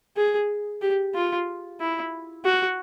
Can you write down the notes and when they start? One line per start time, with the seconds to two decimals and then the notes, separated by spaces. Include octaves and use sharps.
0.17 G#4
0.82 G4
1.15 F4
1.81 E4
2.45 F#4